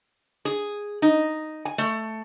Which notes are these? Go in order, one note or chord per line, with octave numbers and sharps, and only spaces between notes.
G#4
D#4
G#5
A3